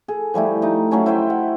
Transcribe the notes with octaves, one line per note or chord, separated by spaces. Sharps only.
G#4 A4
F3 G3 A3 E4
A3 D#4
F#3 A3 C#4 E4
E4 C5 D#5 G5
F#5